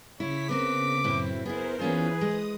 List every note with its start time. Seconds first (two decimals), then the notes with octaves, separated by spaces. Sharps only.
0.20 C#3 E4 C#5 B6
0.49 B3 C4 A#4 D6
1.04 F#2 A2 C4 E4
1.46 B3 E4 G#4 A#4 C5
1.79 E3 B3 C#4 F4 G#4 B4
2.21 G#3 D#6